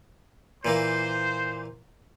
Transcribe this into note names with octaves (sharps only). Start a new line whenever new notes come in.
A#2 E3 A#3 C5